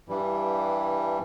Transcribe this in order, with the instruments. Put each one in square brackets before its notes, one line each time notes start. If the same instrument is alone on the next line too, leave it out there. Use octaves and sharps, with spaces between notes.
[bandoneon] G2 E3 G3